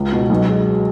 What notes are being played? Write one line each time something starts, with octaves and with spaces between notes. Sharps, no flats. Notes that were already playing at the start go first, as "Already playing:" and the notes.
Already playing: C#2
B2
B1
G#3